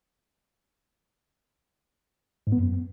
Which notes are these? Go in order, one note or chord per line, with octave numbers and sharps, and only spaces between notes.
G#2
B3
F#2